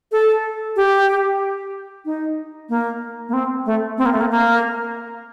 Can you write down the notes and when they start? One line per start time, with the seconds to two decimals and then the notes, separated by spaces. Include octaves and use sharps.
0.12 A4
0.76 G4
2.05 D#4
2.69 A#3
3.29 A#3
3.33 C4
3.66 A3
3.98 C4
4.06 A#3
4.13 A3
4.21 A#3
4.31 A#3